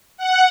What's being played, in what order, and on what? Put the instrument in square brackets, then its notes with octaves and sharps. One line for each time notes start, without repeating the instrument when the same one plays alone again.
[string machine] F#5